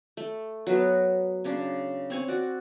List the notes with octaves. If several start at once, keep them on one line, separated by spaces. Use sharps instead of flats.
A3
F#3 B3 F#4 B4
C#3 C#4 D4
C4 C#5 G#5
F#4 D5